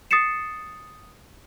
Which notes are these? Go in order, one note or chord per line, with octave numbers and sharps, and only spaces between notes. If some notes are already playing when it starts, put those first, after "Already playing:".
D#6 A6 C7 C#7 E7